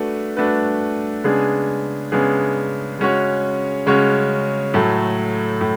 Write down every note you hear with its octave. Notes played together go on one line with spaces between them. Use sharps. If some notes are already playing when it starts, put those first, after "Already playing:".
Already playing: A3 D4 F#4 B4
A3 D4 F#4 B4
C#3 G#3 B3 D4 G#4
C#3 G#3 B3 D4 G#4
C#3 G#3 C#4 F#4 C#5
C#3 G#3 C#4 F#4 C#5
A2 F#3 A3
A2